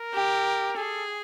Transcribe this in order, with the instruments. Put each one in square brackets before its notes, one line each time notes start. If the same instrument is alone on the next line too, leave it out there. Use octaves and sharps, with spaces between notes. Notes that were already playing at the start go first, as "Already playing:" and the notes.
Already playing: [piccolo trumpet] A#4
[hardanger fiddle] G4
[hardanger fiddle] G#4 [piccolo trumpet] A4